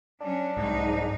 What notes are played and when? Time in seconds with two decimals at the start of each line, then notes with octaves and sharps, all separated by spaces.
0.21 F#3 C#4 D4
0.57 C2 G#2 F#3 D#4